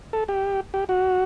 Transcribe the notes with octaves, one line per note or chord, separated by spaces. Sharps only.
A4
G4
G4
F#4